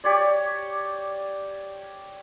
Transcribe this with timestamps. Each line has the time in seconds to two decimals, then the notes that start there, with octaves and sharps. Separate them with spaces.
0.04 G4 C#5 D5